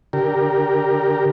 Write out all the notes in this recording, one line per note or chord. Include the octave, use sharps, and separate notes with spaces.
D3 G4 A#4